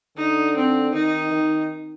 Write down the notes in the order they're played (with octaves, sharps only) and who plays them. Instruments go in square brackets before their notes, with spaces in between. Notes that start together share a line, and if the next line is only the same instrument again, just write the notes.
[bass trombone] D3 [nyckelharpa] D#4
[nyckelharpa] C4
[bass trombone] D#3 [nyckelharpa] D#4
[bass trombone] D#3